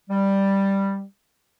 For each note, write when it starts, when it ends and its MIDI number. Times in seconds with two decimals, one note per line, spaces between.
0.09 1.03 55